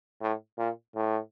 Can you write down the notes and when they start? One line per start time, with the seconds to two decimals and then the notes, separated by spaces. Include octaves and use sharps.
0.21 A2
0.58 A#2
0.95 A2